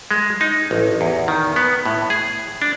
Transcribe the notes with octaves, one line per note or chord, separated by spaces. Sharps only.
G#3
D#4
A1
E2
D#3
B3
A2
G#4
D4